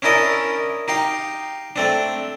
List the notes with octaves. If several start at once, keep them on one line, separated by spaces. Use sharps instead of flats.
C#4 D4 E4 A#4 D#5
D#4 G4 F5
A3 C4 D4